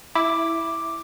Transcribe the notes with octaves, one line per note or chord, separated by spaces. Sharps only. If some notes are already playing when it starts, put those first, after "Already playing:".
E4 D6